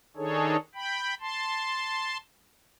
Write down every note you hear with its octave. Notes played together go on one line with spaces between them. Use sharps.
D#3 D4 D#4 G#4 A4 C#5
G5 B5
A5 C6